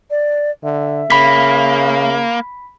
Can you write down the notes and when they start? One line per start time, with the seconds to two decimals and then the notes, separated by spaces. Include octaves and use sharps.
0.10 D5
0.63 D3 E5
1.10 C#3 A#3 B5 B6